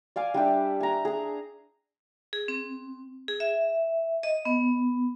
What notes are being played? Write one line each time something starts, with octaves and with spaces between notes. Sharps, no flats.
D5 F5 G#5 D6
G3 D4 G4 E5
G#5 A#5
G#4 A#5
G#4
C4
G#4
E5
D#5
B3